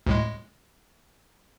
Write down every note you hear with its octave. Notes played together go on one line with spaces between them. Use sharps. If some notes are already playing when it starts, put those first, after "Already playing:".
D2 A2 G#3